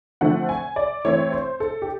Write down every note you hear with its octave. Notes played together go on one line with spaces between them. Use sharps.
D3 F3 A3 C4 F#5
G#5
D5
E3 A3 C4 C#5
C5
A4
G4